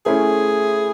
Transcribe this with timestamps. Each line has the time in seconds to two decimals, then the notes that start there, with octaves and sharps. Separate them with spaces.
0.05 A3 C#4 E4 G#4 C5